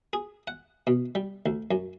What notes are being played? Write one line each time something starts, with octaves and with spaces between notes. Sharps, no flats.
G#4
F#5
B2
G3
D2
F#2